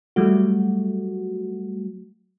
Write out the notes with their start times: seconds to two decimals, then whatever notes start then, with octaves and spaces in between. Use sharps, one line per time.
0.16 F#3 G3 A3 F#4